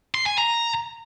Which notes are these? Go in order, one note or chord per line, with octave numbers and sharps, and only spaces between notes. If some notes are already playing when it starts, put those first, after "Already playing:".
C6
G#5
A#5